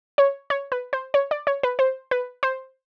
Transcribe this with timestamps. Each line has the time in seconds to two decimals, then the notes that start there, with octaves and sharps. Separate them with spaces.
0.18 C#5
0.50 C#5
0.72 B4
0.93 C5
1.14 C#5
1.31 D5
1.47 C#5
1.63 B4
1.79 C5
2.11 B4
2.43 C5